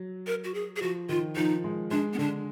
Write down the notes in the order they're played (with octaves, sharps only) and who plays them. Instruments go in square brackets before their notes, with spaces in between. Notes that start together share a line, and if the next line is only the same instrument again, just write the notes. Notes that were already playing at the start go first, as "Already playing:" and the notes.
Already playing: [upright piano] F#3
[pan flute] A#4
F#4
G#4
G#4
[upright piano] F3 [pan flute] F#4
[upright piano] D#3 [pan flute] F4
[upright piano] F3 [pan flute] D#4
[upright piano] G#3
[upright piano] G#3 [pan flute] D4
[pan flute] B3
[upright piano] D3 [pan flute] D4